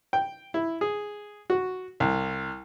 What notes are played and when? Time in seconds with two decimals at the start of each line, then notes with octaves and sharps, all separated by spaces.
0.13 G5
0.54 E4
0.81 G#4
1.50 F#4
2.00 C2